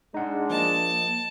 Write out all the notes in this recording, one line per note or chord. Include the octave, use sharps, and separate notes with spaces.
G#3 D4 D#4 F#5
F3 A#3 D#5 A5